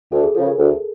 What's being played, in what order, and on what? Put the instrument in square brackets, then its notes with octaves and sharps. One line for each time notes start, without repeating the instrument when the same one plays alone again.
[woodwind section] D2 [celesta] A4
[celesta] G#4
[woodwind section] C#3 F3 [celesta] A4
[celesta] A#4
[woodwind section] D2